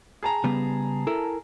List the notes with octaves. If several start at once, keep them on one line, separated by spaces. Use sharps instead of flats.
G#4 A5 A#5
C#3 G3 B3
E4 A4 A#4